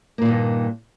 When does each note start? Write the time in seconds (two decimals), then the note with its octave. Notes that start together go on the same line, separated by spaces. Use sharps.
0.18 A#3
0.22 A#2
0.25 D#3
0.28 G2